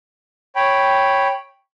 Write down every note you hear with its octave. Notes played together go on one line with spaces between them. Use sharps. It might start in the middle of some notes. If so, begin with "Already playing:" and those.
C#5 G5 B5